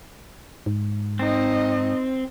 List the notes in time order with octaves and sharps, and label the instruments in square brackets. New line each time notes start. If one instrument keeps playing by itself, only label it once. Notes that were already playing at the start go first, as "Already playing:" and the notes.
[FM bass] G#2
[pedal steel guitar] C4 [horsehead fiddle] D#4 D#5